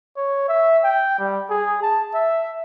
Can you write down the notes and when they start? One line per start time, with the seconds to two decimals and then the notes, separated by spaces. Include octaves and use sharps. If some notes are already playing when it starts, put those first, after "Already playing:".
0.17 C#5
0.48 E5
0.84 G5
1.19 G3
1.50 G#4
1.82 A5
2.14 E5